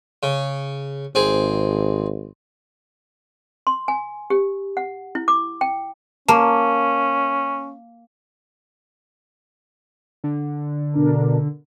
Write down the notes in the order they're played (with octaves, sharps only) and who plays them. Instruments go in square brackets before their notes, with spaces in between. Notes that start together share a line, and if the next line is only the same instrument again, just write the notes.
[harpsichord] C#3
[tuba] G#1 [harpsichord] C4 G#4
[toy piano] C6
G#5
G4
F#5
E4
D6
G5
[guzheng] A#3 [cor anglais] C#4 [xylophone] A5
[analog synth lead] D3
[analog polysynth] B2 D4 A#4